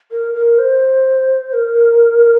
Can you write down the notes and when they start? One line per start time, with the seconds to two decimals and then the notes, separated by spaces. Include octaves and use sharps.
0.11 A#4
0.34 A#4
0.59 C5
1.53 A#4